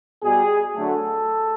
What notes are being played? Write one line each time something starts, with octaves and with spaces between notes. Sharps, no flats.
B2 G3 G#4
D3 F#3 A3 A4